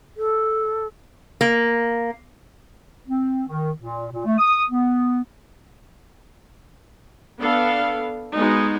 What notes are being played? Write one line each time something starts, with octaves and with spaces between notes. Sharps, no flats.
A4
A#3
C4
D#3
A#2
A#2
A3
D#6
B3
B3 D4 A4 F5
G#3 B3 D#4 F#4